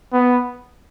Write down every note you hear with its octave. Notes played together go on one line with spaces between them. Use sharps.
B3